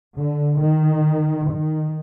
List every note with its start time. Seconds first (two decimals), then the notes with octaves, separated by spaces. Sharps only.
0.15 D3
0.59 D#3
1.50 D#3